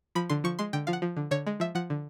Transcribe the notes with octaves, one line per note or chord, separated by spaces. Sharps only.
F3 B5
D3 C6
F3 C#6
G#3 C6
D3 G5
F3 F5
F#5
F3
D3
D3 C#5
G#3
F3 E5
F3 F#5
D3